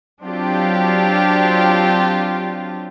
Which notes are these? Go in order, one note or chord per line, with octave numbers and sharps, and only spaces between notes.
F#3 C4 D4 F4 G4